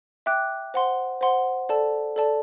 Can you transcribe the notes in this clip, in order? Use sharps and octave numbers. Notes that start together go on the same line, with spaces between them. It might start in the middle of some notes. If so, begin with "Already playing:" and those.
E5 G5 D6 F#6
C5 F#5 C6
C5 F#5 C6
A4 D5 A5
A4 D5 A5